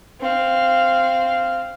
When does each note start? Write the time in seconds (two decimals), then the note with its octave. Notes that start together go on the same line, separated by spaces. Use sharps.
0.22 C4 F5